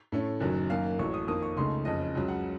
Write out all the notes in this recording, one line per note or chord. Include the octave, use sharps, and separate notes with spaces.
A2 A3 C#4
F#1 F#2 D#3 F#3
F#2 D#3 A#3 F5
A1 A2 F#3 C#6
D#6
F2 D#3 A#3 D#6
C#6
C#2 C#3 A3 D#4 C6
F#1 F2 C#3 D#5
C#2 C#3 F#3
F#5